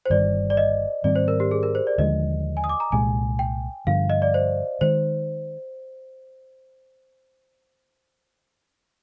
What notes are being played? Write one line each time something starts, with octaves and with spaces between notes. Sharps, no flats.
C5
G1 G2 D#3 G3 D5
D5
D#5
G#2 D#3 G3 C4 D5
C5
A#4
G4
G#4
A#4
C5
D5
D#2 D3 F3 G#3 D#5
G#5
D#6
D6
A#5
C2 A#2 G#3 G#5
G5
G2 D3 F3 F5
D#5
D5
C5
D#3 G#3 C5